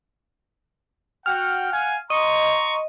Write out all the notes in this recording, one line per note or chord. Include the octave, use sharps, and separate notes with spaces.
F#4 F#5 G5 F6
F5 F#5 G#5
D#5 A#5 C6 C#6